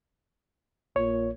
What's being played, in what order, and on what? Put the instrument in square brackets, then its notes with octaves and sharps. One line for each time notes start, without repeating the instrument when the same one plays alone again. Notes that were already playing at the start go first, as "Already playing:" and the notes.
[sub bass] A#1 [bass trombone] A#2 [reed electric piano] C#5